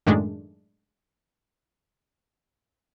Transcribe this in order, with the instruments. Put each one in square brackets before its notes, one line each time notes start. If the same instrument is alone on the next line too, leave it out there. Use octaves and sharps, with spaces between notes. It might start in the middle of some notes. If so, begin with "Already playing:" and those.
[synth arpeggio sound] F#2 A2 D#3 G#3 A3 D4